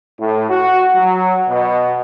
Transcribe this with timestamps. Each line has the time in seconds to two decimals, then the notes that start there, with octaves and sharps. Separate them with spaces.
0.19 A2
0.49 F#4
0.95 F#3
1.48 B2